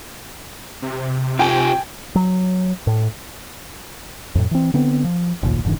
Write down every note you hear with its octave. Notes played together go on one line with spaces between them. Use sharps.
C3
F4 G4 G5 G#5
F#3
A2
F2 A2
E3 C4
D3 B3 C4
F3
F1 A#1 D#2 A#2
F1 G#2 D3 E3